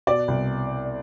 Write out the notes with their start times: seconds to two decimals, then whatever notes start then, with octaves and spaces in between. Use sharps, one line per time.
0.07 B2 D5
0.28 C2